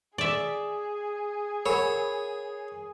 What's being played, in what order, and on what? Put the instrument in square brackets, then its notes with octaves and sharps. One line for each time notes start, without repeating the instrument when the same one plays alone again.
[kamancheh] G#4 [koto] D5 E5
[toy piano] A#4 F#5 B5 [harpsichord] C#5